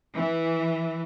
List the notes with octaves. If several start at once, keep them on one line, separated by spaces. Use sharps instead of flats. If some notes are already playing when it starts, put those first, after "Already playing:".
E3